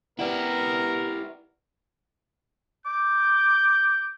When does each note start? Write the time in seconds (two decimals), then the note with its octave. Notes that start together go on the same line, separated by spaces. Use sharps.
0.19 B3 E4 G4 A#4 B4 D5 F#5
2.86 D6 G6